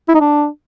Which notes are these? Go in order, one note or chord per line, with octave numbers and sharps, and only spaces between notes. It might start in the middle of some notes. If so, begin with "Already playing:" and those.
E4
D#4
D4